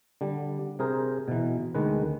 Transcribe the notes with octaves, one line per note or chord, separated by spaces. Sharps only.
D3 G3
C3 G#4 A#4 C5
B2 E3
D2 D#3 G#3 B4